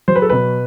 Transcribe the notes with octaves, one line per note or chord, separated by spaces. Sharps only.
F#3 C5
B4
A4
B2 B4